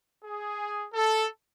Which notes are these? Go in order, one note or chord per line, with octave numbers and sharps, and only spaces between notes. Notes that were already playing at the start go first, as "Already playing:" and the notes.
G#4
A4